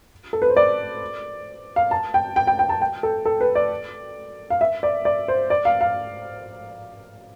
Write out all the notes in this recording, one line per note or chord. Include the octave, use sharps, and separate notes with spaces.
A4
B4
C5
D5
F5
A5
G5
G5
G5
G5
A5
G5
A4
A4
B4
D5
F5
E5
D5
D5
C5
D5
F5
F5